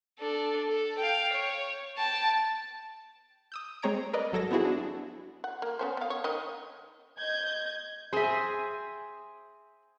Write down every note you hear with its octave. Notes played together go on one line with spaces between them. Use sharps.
D4 A4
A4
F5 G5
C#5
G5 A5
D#6 E6 G6
G#3 C4 C#5 A#5 G#6 D7
A#4 B4 D5 D#5
G#1 F#3 A4 G#6 A#6
B3 C4 E4 F#4 G#4
D4
F#5
A#3
B3 C#4 C5
B3 F5
C#5
D#3 D#5
D#5 G6 G#6
C4 G#4 C5 E5